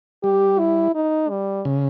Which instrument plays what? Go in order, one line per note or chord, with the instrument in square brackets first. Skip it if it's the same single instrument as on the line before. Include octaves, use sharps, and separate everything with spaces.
[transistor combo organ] G3 [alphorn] G4
[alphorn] E4
D#4
G3
[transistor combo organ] C#3